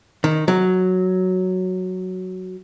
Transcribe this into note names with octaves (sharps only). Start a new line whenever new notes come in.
D#3
F#3